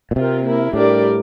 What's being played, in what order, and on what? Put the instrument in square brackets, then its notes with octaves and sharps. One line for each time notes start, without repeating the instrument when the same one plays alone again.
[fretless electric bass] A#2
[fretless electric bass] C3 [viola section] C4 F4 A#4
[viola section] A#3 E4 A#4
[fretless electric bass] A2 [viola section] G3 D4 G4 A#4 D5